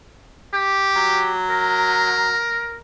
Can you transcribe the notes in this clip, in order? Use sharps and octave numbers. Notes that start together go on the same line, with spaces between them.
G4
F#3
A#4